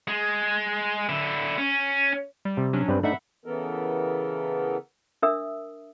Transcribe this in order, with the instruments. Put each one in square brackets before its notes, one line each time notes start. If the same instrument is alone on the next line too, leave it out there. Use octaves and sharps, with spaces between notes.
[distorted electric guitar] G#3
D3 E4
C#4
[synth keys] G3
[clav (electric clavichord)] C3
[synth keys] F#3 C#4 D4
[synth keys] G2 [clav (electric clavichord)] G3 C4 B4
[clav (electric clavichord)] A3 D4 D#4 [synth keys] E5 F#5 B5
[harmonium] C#3 E3 B3 A4 A#4
[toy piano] D4 A#4 E5 D#6 E6